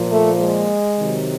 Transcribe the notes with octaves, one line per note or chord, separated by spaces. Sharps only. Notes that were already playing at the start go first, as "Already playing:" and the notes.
Already playing: A#2 F3
A3
G#3
C3 D#3 F#3